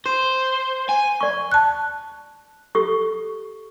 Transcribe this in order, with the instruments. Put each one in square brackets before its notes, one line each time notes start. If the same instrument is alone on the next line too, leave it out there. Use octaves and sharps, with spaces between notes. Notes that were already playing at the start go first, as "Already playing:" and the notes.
[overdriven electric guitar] C5
G#5
[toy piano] D5 C#6
[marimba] A5 F#6
[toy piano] G4 A4 C#6